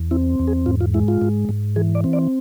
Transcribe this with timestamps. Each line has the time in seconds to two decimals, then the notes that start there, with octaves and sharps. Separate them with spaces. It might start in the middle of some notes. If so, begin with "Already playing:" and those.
Already playing: E2
0.11 C4 E4
0.39 E2
0.48 G#4
0.66 G#2 F4
0.81 F4
0.94 G#3 E4
1.08 F4
1.22 G#2
1.49 G#2
1.76 E3 G#4
1.95 D5
2.04 C4
2.13 D5